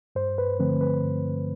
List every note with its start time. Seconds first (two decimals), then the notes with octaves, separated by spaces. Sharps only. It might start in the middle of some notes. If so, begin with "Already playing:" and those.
0.15 G2 C5
0.38 B4
0.59 D3 F3 A3 C4 B4
0.81 B4
1.03 G2